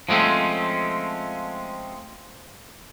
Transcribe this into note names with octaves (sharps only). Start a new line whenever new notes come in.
F3 G#3 A3 C4 C#4